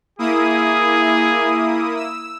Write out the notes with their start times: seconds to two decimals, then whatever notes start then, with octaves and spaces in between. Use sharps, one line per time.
0.19 A#3 E4 G#4 D#6
1.96 E6